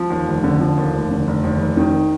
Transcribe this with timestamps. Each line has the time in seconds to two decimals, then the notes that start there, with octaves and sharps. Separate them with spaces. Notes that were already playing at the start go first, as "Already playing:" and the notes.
Already playing: F3
0.10 D#2
0.27 F1
0.44 D3
0.60 F3
0.77 D#2
0.94 F1
1.10 D3
1.27 F1
1.44 D#2
1.61 F1
1.77 D#3